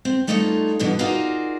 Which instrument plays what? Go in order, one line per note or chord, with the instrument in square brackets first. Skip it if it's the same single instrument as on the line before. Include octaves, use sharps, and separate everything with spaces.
[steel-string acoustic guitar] C4
G3 A3 D#4 F4 B4 C#5
G2 B2 D3 E3
D#4 F4 F#4 G#4 A#4 D5